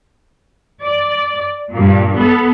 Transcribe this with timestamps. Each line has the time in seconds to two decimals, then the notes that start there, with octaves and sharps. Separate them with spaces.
0.83 D5
1.74 G2 A#2
2.16 B3 A4